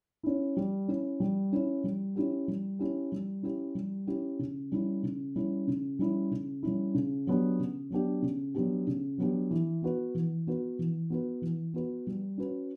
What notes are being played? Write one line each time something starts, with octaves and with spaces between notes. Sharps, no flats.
C#4 E4
G3
C#4 E4
G3
C#4 E4
G3
C#4 E4 G4
G3
C#4 E4 G4
G3
C#4 E4 G4
G3
C#4 E4 G4
C#3
G3 C#4 E4
C#3
G3 C#4 E4
C#3
G3 C#4 E4
C#3
G3 C#4 E4
C#3
F#3 B3 D4 G4
C#3
F#3 B3 D4 G4
C#3
F#3 B3 D4 G4
C#3
F#3 B3 D4 G4
E3
B3 F#4 B4
E3
B3 F#4 B4
E3
B3 F#4 B4
E3
B3 F#4 B4
G3
C#4 F#4 B4